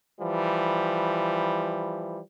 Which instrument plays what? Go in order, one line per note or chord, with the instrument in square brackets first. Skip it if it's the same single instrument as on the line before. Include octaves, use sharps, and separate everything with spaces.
[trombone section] E3 F3 G3